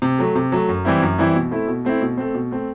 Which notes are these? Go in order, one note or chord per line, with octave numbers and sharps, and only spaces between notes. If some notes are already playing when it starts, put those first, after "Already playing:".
C3
F#3 A3
C3
F#3 A3
F#2
E3 G3 C4 E4
F#2
E3 G3 C4 E4
B2
A3 C4 E4
B2
A3 C4 E4
B2
A3 C4
B2
A3 C4